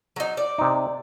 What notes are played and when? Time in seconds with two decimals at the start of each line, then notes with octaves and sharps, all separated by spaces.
0.16 F#3 D#4
0.37 D5
0.58 C3 D#4